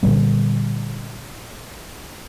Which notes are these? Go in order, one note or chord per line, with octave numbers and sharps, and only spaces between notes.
A#2 D3 G3 B3